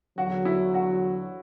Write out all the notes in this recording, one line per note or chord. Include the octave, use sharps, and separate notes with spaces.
E2 D3 F#3 F#4
E4
F#4